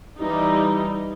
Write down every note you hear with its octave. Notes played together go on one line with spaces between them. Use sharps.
E3 G3 D#4